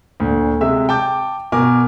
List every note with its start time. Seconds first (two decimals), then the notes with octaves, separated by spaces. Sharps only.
0.20 D2 A#2
0.61 C3 G#3 E5 E6
0.89 G5 A5 D6 G6
1.52 B2 A#4 G#5 D6